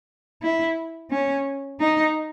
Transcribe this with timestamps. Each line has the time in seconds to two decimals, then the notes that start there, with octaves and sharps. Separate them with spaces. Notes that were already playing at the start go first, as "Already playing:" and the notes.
0.42 E4
1.11 C#4
1.80 D#4